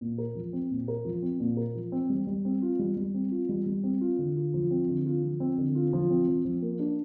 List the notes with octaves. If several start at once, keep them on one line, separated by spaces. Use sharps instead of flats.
A#2
A#4
F3
C4
A#2
A#4
F3
C4
A#2
A#4
F3
C4
G3
G3
C4
F4
G3
G3
C4
F4
G3
G3
C4
F4
D3
F4
F3
C4
D3
F4
F3
C4
D3
F4
F3
C4
F3
F3
A#3
D4